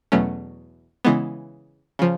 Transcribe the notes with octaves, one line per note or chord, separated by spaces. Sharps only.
E2 B2 F#3 A3 C#4
C#3 E3 G#3 B3
C#3 F3